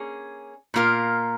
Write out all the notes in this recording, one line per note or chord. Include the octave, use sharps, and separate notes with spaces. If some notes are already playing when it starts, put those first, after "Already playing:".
Already playing: A#3 C#4 G#4
A#2 A#3 F4 A#4 F5